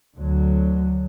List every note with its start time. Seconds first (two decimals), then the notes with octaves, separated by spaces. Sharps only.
0.15 D2 D3 F#3